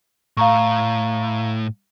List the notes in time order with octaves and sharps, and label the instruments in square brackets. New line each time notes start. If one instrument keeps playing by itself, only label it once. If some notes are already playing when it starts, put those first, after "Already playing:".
[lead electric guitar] A2 [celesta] F5 A#5 C#6